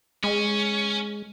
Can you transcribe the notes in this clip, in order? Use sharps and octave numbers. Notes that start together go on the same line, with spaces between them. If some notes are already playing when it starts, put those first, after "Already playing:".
G#3 C#4